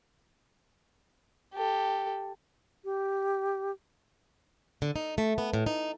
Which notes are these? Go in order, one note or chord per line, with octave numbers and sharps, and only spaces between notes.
G4 A4
G4
D3
D#4
A3
B3
A2
D#4